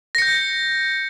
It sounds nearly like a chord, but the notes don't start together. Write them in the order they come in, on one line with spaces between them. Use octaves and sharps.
A#6 C#7 G6